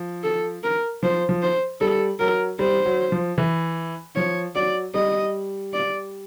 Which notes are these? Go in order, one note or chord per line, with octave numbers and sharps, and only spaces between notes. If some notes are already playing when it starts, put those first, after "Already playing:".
Already playing: F3
A4
A#4
F3 C5
F3
C5
G3 A4
F#3 A#4
G3 C5
F#3
F3
E3
F3 C#5
F#3 D5
G3 D#5
D5